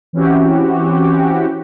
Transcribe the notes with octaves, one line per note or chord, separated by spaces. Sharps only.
E3 C4 C#4 E4 F#4 G4